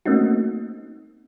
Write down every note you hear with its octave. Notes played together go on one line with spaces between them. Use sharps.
A3 A#3 C4 C#4 D#4 F#4